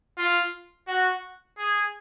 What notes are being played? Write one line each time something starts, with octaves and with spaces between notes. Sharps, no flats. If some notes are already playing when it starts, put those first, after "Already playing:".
F4
F#4
G#4